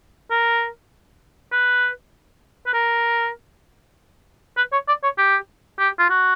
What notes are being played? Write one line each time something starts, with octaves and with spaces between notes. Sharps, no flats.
A#4
B4
B4
A#4
B4
C#5
D5
C#5
G4
G4
F4
F#4